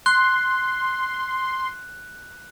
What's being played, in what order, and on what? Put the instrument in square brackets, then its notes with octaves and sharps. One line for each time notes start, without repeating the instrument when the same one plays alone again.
[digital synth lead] C6 [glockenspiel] F#6